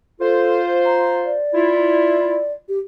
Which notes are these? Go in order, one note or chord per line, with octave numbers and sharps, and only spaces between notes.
F4 A4 C5
A#5
D5
E4 F4
G4